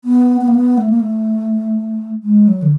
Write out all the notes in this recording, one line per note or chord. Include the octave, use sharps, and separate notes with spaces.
B3
B3
A#3
B3
A3
A#3
A3
G#3
F#3
D3